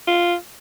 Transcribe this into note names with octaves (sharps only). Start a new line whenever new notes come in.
F4